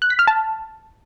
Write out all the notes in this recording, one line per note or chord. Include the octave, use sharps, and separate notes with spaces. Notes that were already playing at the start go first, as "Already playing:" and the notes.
F#6
B6
F6
A5